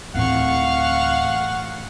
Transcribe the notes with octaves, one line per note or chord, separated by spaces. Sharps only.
D1 A2 E3 C4 F5 F#5 C#6